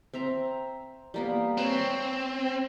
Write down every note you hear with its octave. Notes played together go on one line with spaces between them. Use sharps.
C4 E5 A#5
G3 A#3 B3
C4 B4 C#5 G#5